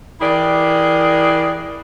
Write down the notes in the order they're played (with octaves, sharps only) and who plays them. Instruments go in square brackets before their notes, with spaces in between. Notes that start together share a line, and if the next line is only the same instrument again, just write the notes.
[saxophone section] E3 E4 G4 G#4 A#4 D5